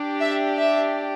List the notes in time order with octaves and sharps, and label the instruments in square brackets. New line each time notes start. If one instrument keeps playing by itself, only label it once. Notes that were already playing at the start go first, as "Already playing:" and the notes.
Already playing: [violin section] D4 G4
E5
E5